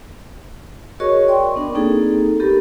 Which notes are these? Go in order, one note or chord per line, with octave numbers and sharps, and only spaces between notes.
F#4 G#4 A#4 C#5 D#5 C#6
D5 G5 C6 C#6
B3 D4 A#4
A#3 C4 D#4 G#4 A4
B3 G4 A4 A#4